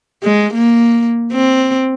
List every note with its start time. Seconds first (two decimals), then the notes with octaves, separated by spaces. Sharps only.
0.23 G#3
0.53 A#3
1.32 C4